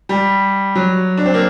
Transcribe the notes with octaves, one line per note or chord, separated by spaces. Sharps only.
G3
F#3
D4
C4
A#3